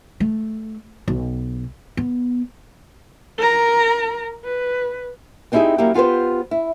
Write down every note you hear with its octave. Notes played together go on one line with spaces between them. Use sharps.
A3
B1
B3
A#4 A#5
B4
B3 C4 D#4 E4 G4 G#4
F#3 A#3 C#4 E4 G4
B3 F4 G4 B4 C5
E4